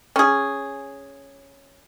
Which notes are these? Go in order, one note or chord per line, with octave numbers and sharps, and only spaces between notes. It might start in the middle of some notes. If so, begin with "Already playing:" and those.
C#4 G#4